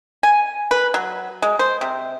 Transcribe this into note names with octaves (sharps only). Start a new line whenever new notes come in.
G#5
B4
F#3
G#3
C5
C3